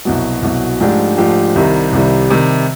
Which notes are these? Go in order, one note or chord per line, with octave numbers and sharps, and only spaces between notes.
C2 B2 F#3
C2 B2 F#3
G#2 F3 A3 D4 G4
G#2 F3 A3 D4 G4
C2 C3 D#3 G3
C2 C3 D#3 G3
C3 D#3 G3